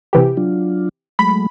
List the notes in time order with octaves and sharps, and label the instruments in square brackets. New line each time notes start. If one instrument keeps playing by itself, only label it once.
[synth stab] C3 E3 G4
[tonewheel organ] F#3 D4 F4
[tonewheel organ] F#3 G#3 A3 [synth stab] B5